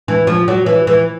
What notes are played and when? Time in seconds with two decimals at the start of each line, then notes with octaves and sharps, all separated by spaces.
0.08 E3
0.27 F3
0.48 F#3
0.66 E3
0.87 E3